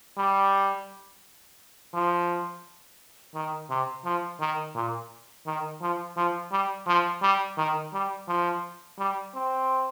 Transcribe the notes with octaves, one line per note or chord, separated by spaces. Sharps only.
G3
F3
D#3
C3
F3
D#3
A#2
D#3
F3
F3
G3
F3
G3
D#3
G3
F3
G3
C4